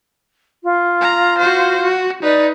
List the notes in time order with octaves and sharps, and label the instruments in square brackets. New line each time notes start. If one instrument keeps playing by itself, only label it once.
[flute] F4
[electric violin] A#5
F#4 C5
F#4
[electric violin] D#4 B4 [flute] D5